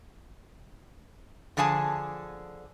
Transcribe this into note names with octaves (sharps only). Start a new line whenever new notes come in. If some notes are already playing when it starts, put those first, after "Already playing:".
D3 F3 G#4 G#5 A5